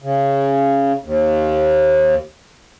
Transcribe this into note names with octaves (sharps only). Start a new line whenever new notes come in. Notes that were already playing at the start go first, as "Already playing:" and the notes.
C#3
D#2